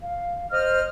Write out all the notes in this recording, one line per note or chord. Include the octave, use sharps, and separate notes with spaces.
F5
C5 D#5 F6